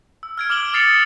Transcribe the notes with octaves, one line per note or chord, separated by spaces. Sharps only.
E6
F6 G#6 D7
D6 F6 D7 F#7 G7
D6 D#6 A6 C7 C#7 F7